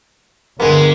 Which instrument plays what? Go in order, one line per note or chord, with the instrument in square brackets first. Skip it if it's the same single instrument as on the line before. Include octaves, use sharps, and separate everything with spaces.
[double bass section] G1 D3 [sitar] G#3 B3 [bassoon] A#3